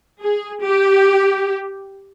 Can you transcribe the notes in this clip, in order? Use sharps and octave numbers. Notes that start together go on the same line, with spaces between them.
G#4
G4